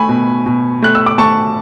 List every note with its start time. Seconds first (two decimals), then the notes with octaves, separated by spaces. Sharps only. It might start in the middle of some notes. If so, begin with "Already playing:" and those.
Already playing: A3 G#5 B5 C#6
0.09 B2
0.46 B2
0.82 A3 F#6
0.95 E6
1.06 D6
1.18 A3 A5 C#6